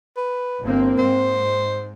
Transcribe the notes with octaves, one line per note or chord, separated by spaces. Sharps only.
B4
G1 A#3 C4
G#2 C5